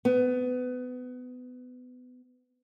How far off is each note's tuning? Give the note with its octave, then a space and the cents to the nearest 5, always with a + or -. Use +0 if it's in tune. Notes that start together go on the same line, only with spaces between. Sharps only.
B3 +25